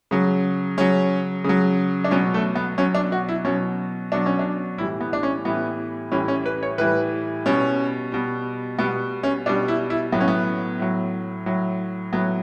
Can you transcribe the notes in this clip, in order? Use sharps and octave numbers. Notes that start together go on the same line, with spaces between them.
C#3 F#3
C#3 F#3 C#4
C#3 F#3
D4
B2 F#3 C#4
A3
B3
B2 F#3 C#4
D4
F#4
E4
B2 F#3 C#4
B2 F#3 D4
C#4
D4
A2 E3 G3 E4
B3
D4
C#4
A2 E3 G3 B3
A2 E3 G3 C#4
C#4
B4
C#5
A2 E3 G3 B4
B2 G3 C#4
B2 G3
B2 G3 B3
C#4
B2 G3 D4
E4
E4
A2 F#3 B3
C#4
B3
A2 F#3
A2 F#3
A2 F#3 B3